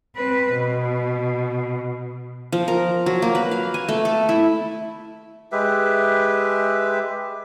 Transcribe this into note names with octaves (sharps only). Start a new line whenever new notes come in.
C4 B4
B2
F3
A#4
F#3
A#3
B4
F5
G#5
A3
A4
E4
G#3 G4 B4 E5